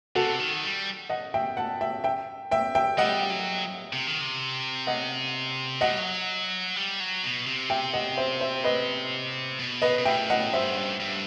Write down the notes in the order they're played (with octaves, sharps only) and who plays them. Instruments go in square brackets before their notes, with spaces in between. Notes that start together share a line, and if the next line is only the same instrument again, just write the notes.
[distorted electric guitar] C3 [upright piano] F#4 A4
[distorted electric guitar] D#3
G3
[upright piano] D#5 F#5
E5 G5
F#5 A5
E5 G5
E5 G5
E5 G5
E5 G5
[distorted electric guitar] G3 [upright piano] D#5 F#5
[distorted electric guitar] F#3
C3
D#3
C3
[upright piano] D#5 F#5
[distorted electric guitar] F#3 [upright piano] D#5 F#5
[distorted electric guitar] G3
F#3
G3
F#3
B2
C3
[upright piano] E5 G5
D#5 F#5
C5 E5
C5 E5
B4 D#5
[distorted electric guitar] B2
[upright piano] B4 D#5
[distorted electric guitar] B2
[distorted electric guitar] A2 [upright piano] E5 G5
[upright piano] D#5 F#5
[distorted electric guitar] G2 [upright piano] C5 E5
[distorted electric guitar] G2